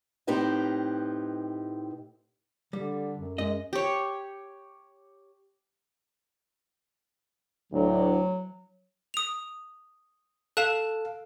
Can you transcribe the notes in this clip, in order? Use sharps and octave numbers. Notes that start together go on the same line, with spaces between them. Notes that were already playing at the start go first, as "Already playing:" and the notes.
A2 C4 D#4 G4 B4 D#5
D3 G3
F#2
F#2 G#3 D#5
G4 C#5
D2 A2 F#3
D#6 F7
A4 F5 F#6 E7